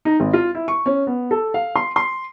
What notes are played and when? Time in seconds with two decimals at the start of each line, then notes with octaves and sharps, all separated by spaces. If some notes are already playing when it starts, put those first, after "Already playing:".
0.05 D#4
0.20 G#1
0.33 F4
0.55 E4
0.68 C#6
0.86 C#4
1.07 B3
1.31 A4
1.54 F5
1.76 C6
1.96 C6